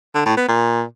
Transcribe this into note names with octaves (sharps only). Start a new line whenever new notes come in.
D3
A2
B3
A#2